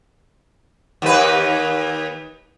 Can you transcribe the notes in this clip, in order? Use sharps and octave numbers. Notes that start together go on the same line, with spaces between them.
D#2 B4